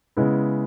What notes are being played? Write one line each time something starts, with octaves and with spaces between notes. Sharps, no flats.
C#3 G#3 B3 E4